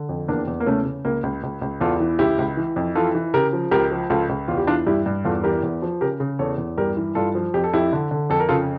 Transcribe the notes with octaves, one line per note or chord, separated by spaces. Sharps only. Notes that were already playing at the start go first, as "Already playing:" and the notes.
Already playing: D3
F2
E2 A#3 D4
E2
A#3
C#3 A3 C#4
C#3
C#2 A#3
C#2
C#2
C#2
E2 F4 A4
E3
C#2 E4 G4
C#2
E3
F2
E3 F4 A4
E3
C#3 G4 A#4
F3
C#2 G4 A#4
F3
C#2 F4 A4
C#2
E2 F4
G4
E3 D4 F4
G2 E4 G4
G2
E2 F4 A4
E3 G4 A#4
E2
F3
C#3 G4 A#4
C#3
E2 A4 C#5
E2
G2 G4 A#4
E3
G2 F4 A4
F3
F2 G4
A4
F2 E4 G4
D3
D3
F2 A4
A#4
C#3 F4 A4